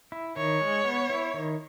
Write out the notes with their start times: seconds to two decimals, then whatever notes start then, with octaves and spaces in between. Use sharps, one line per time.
0.12 E4
0.36 D#3 C#5
0.61 G#3
0.85 B3
1.10 E4
1.34 D#3